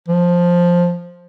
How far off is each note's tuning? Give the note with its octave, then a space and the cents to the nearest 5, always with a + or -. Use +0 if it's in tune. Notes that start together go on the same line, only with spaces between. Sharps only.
F3 +5